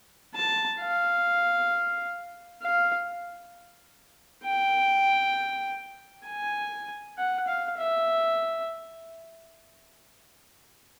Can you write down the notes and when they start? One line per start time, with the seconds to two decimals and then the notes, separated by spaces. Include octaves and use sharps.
0.35 A5
0.81 F5
2.62 F5
4.45 G5
6.27 G#5
7.17 F#5
7.47 F5
7.78 E5